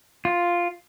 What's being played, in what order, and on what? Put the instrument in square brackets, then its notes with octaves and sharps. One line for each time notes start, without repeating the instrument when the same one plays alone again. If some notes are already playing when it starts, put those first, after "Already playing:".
[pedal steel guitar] F4